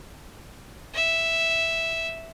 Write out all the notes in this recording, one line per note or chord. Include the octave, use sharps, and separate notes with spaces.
E5